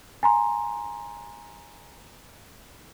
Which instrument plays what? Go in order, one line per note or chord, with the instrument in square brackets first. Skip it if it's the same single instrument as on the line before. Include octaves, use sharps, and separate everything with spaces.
[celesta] G#5 A#5 C6